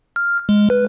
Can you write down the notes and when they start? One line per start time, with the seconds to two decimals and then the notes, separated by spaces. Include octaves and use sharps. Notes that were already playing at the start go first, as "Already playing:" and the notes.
0.16 F6
0.49 G#3
0.70 B4